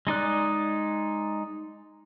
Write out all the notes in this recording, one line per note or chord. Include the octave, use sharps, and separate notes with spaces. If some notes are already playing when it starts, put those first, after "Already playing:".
G#3 D#4 D5 F#6